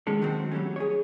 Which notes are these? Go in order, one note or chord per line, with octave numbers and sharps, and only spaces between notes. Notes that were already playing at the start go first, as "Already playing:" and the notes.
D#3 G#3 C#4 A4
D#2 D#3 F#3 G#3 C4
F#3 G3 A3 C#4
G#4 C#5